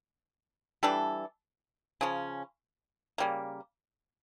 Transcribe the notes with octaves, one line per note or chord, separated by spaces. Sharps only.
E3 G3 D4 A4
C#3 F3 C#4
C#3 G3 A#3